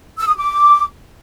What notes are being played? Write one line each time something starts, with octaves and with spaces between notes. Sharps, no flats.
E6
D#6
D6